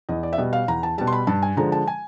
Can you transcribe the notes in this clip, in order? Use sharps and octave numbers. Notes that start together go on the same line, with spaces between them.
E2 D#5
D5
E5
B2 G3 D#5
F5
E2 A#5
A5
B2 G3 A5
C6
B5
G2 A5
G#5
D3 F3 G#3 A#5
A5
G#5